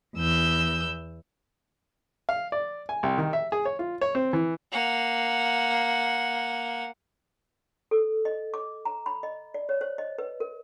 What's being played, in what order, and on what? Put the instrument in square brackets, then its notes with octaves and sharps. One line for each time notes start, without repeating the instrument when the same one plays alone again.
[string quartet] E2 E6 G6
[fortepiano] F5
D5
G#5
C2
D#3
E5
G#4
C#5
F4
C#5
C4
E3
[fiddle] A#3 F#5
[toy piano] A4
D#5
D6
A#5
B5
D#5
D5
C#5
C5
D#5
B4
A#4